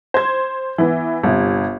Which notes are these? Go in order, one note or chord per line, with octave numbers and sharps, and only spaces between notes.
C5 G#6
E3 B3
G1 C3